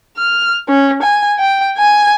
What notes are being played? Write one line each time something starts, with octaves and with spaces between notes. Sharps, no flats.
F6
C#4
G#5
G5
G#5